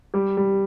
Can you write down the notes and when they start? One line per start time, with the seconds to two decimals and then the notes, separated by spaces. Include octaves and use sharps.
0.14 G3 G4
0.37 G3